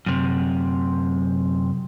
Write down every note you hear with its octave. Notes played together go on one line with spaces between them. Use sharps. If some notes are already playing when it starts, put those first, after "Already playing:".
F#2 C3